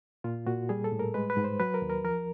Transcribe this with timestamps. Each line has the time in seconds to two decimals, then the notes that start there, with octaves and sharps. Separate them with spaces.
0.24 A#2 F4
0.47 A#2 F#4
0.69 G3 G#4
0.84 A4
0.92 A2
0.99 A#4
1.14 G#3 B4
1.30 B4
1.37 G#2
1.44 C5
1.60 F#3 B4
1.74 A#4
1.82 D#2
1.90 A#4
2.04 F3 A#4